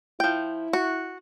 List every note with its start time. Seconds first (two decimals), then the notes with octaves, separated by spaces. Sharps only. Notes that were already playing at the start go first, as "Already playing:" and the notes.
0.20 F3 E4 G5
0.73 F#4